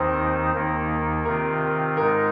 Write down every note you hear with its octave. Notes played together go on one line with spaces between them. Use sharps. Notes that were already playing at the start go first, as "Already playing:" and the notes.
Already playing: D#2 D#3 C4 D#4 C5
D#2 D#3 A#3 D#4
C3 D#3 C4 F4 A#4
G#2 G#3 D#4 A#4